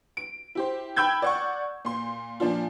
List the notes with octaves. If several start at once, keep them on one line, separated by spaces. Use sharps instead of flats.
D7
E4 G4 C5
G5 B5 E6 G6 G#6
D5 F#5 C#6
A#2 C6
A#2 F3 D4 F4